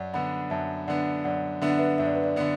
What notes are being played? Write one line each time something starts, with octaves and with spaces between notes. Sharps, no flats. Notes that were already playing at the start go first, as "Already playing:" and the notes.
Already playing: F#2 D5 F#5
D3 B3 D4 F#5 B5
F#2 E5 A5
D3 B3 D4 D5 F#5
F#2 D5 F#5
D3 B3 D4 E5
F#5
B4 E5
F#2 E5
D5
B4
D5
D3 B3 D4 D5